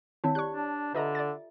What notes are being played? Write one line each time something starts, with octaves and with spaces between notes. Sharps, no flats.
D#3 C4 E4 C#5 F5 A5
G4 D5 C#6 F#6
D4
D3 F4 A4 B4 D#5 E5 A#5
D5 A6